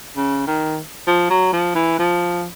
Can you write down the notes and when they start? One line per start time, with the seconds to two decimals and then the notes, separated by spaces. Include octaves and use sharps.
0.16 C#3
0.47 D#3
1.07 F3
1.30 F#3
1.53 F3
1.75 E3
1.99 F3